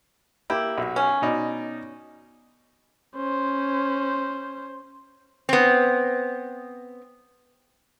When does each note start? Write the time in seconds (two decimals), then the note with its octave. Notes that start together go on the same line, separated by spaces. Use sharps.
0.50 A#3 E4 G4 G5
0.78 B1 F#4
0.96 C#4
1.22 B2 D#4 D5
3.16 C#4 C5
5.49 B3 C4